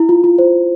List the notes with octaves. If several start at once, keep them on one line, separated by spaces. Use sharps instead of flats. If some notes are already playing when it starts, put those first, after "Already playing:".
Already playing: E4
F4
F4
C5